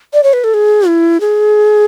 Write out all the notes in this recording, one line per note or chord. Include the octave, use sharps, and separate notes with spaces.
D5
C#5
B4
A4
G#4
E4
G#4